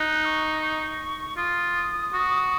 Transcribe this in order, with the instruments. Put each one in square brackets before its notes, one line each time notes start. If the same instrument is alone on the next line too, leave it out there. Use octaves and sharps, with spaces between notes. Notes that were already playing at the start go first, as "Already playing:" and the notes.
Already playing: [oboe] D#4 [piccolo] F#6
[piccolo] C#6
C#6
[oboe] F4 [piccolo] D#6
[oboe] F#4